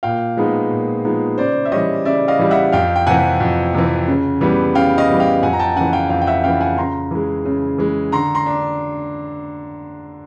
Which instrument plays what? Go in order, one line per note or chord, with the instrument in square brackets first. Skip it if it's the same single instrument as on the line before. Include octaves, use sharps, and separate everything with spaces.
[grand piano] A#2 F5 G5
F3 G#3 B3 D#4
A#2
F3 G#3 B3 D#4
C#3 C5 D5
E5
E3 G3 C#5 D#5
C#3 D5 E5
D#5 F5
E3 G3
E5 F#5
F2 F5 G5
G5
C3 E3 F#5 G#5
F2
C3 E3
C#3
E3 G3 B3
C#3 F5 G5
D#5 F5
E3 G3 B3
F5 G5
F2 F#5 G#5
A#5
G5 A5
C#3 E3 F#5 G#5
F5 G5
F2 F5 G5
G5
E5 F#5
C#3 E3 F5 G5
F#5 G#5
C#3 A#5 C6
E3 G#3
C#3
E3 G#3
D3 A#5 C6
A#5 C6
D4